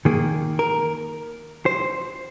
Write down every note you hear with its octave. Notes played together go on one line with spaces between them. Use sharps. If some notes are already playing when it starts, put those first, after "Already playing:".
D#3 A#3 G#4
A#4
C5